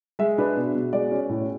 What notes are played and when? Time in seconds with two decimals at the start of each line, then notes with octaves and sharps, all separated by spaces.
0.19 G#3 E5
0.38 D4 B4
0.56 B2
0.74 B2
0.93 G#3 D5
1.12 C#4
1.29 A2